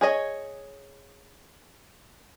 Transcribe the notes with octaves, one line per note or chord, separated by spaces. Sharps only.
G#4 C#5 D#5